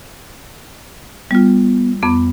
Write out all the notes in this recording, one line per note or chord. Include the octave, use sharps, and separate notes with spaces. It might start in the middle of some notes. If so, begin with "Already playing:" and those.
G3 B3 F4
F2 B3 D6